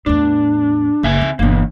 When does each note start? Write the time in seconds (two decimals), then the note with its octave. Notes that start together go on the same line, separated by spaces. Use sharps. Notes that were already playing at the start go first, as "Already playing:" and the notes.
0.06 E2 A2 D4
1.03 F#1 C#3 E5 G#5
1.21 C4
1.39 G1 B2 E3 A#3